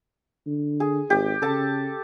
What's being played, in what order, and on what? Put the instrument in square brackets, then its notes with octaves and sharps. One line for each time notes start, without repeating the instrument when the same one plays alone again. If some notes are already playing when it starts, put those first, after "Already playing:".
[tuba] D3
[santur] G#4
[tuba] G#1 [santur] G4
[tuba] C#3 [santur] A4 A5